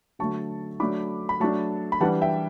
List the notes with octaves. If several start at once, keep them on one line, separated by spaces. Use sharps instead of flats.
D3 F#3 A3 A5 C#6
F#3 A3 D4 B5 D6
B5
F#3 A3 D4 A5 C#6
B5
E3 G3 D4 F#5 A5
E5 G5